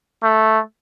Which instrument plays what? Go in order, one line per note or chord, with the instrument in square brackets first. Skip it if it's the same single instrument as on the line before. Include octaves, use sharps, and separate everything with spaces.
[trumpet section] A3